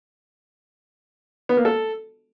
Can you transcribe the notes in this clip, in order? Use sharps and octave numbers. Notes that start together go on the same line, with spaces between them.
B3
A#3
A4